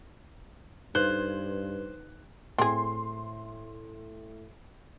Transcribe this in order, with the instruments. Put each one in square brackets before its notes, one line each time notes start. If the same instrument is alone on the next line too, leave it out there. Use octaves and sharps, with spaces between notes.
[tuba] G2 [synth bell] D#4 B4 [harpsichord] C5 [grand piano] F#6
[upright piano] A2 [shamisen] C4 G#4 [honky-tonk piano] C6